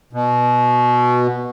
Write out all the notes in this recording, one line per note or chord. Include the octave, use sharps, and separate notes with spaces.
B2